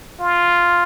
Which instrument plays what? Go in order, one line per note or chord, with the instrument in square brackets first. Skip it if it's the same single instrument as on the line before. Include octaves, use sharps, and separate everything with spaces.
[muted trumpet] F4